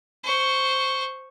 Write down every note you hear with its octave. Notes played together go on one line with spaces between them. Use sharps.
C5 C#6